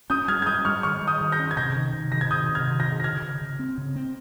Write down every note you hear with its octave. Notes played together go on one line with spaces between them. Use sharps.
C#4 D#6 G6
G3 F6 G#6
G#6
G3 D#6 G6
G3 C#6 F6
D#3 C#6 F6
G3
D#6 G6
D#3
G6 A#6
C#4
G#6
C3 G6 A#6
D#3
C3
D#3 A#6
G#6
C3 D#6 G6
C3
F6 G#6
D#3
G6 A#6
C3
A#6
C#3 F6 G#6
C#3
C#3
C4
C#3
C4